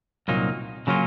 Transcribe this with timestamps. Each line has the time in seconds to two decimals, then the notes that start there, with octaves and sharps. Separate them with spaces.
0.28 C2 A#2 F#3 A#3 D#4
0.87 C#3 F#3 A#3 C#4 F4